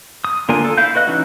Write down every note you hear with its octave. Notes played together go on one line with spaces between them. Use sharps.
D#6
D3 A#3 D4 F4 G#5
A4
E4 F5 G6
F#4 B4 D#5 F#6
E3 C#4 D#4 E4 F#4